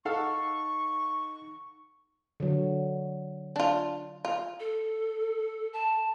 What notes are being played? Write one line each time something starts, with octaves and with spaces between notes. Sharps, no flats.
D#4 A4 F5 F#5 C#6
D3 F#3
D4 F4
F4
A4
A5